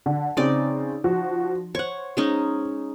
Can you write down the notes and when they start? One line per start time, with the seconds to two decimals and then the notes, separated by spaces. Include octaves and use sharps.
0.06 D3
0.37 C#3 C4 D#4 D5
1.04 F3 F#4
1.75 C5 C#5 F#5
2.17 G#3 C#4 D#4